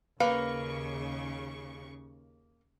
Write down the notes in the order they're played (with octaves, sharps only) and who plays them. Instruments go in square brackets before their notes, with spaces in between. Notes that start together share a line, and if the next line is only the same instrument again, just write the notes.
[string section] D#2 C#3 C#6 [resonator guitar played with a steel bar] A#3 [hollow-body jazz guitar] B4 [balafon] F5